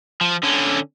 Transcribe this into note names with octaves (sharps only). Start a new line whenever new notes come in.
F3
D3 C#4